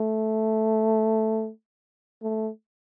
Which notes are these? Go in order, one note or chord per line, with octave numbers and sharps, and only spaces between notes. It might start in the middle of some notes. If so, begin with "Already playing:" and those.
Already playing: A3
A3